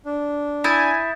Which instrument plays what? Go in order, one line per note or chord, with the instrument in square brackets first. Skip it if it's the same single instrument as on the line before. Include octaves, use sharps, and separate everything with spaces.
[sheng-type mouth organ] D4
[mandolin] E4 [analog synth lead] G#5 [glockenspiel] D#6 G6 A6